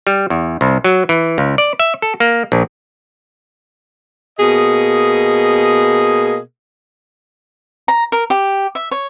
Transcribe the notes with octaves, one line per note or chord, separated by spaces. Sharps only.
G3
E2
C2
F#3
E3
C#2
D5
E5
A4
A#3
A#1
B2 A#3 G#4 D#5
A#5
A#4
G4
E5
C#5